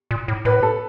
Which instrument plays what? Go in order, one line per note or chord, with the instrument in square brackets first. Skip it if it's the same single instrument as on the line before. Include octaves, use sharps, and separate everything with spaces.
[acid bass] A#2
A2
[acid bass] A2 [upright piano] B4
[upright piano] A4